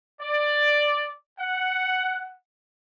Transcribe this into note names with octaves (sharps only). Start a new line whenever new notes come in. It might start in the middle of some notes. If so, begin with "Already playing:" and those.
D5
F#5